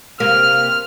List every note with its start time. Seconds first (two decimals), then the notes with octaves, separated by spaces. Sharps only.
0.20 C3 A#3 F6